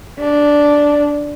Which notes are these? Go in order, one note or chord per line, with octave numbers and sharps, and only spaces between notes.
D4